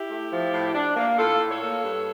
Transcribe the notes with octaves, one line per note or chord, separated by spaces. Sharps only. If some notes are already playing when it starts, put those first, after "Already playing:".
Already playing: E4 G4
A3
F3
A2
D4
A#3
A2 F4 A4
A2
A4 C#5
A#3
G2